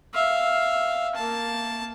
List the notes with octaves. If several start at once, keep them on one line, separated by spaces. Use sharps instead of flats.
E5 F5
A#3 A5